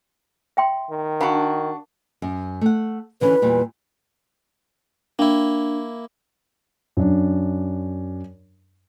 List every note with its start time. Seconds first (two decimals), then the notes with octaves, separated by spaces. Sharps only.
0.57 E5 G5 C6
0.91 D#3
1.21 D4 F#4 A#4 F5 B5
2.22 F#2
2.61 A3 F#5
3.21 D3 E3 C#4 B4
3.42 E2 A#2 G3
5.19 A#3 D4 E4
6.97 F#2 D4